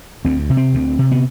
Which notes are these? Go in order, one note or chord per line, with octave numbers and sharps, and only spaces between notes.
D2 C4
C3
C4
D2
C3
B3